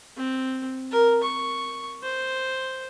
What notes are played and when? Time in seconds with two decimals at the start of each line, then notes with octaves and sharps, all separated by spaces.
0.17 C4
0.92 A#4
1.23 C#6
2.04 C5